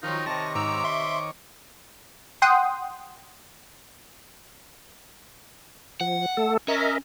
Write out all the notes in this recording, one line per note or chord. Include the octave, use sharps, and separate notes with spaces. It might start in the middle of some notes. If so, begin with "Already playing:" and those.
D#3 F3 F#3 D#4 F4
C3 D#3 C#5 A5 A#6
G#2 A#5 D6 E6
E5 C6
F#5 G5 C6 D#6
F3 F#5
A3 A4
C#4 A#4 D#5 E5